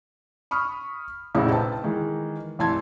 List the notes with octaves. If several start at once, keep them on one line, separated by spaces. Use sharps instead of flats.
B5 C#6 D#6 F6
F1 A#1 C#3 D#4 E4
B4 C5 G5 A5
D#3 E3 G#3
F1 E3 A5 C6 G#6